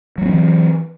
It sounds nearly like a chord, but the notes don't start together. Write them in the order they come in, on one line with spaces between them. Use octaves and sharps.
F#3 A3 C4 E3